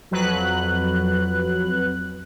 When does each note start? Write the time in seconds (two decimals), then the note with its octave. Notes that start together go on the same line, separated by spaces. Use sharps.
0.11 F2 F#3 B4 F#6